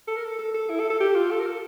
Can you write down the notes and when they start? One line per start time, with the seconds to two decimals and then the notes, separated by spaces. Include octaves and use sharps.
0.08 A4
0.16 A#4
0.25 A4
0.39 A4
0.54 A4
0.70 E4
0.80 A4
0.90 A4
1.00 G4
1.15 F4
1.31 A4
1.40 A#4
1.46 A4